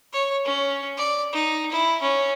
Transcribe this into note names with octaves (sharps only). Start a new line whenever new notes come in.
C#5
C#4
D5
D#4
E4
C#4